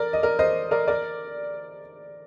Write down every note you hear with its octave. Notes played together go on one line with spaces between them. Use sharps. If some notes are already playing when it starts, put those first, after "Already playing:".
Already playing: A#4 D5
D#5
A#4 D5
C5 D#5
A#4 D5
A#4 D5